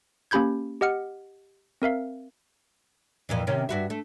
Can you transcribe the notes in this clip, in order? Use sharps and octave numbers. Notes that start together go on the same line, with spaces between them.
A#3 C#4 G4 B5 G6 G#6
G4 D#5 F#5 F6 C#7
C4 A#4 E5 F5
F2 A#2 E3
C3 D#3 C#4
G2 F#4 E5
A3